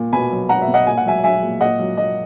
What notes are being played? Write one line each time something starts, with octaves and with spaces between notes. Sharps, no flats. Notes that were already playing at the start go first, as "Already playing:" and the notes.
Already playing: A#2
B2 G#5 B5
F#3
F#3 F#5 A#5
E5
B2
D#5 F#5
A#2 G#5
F#5
F#3 E5 G#5
F#3 E5 G#5
A#2
A#2 D#5 F#5
F#3
F#3 D#5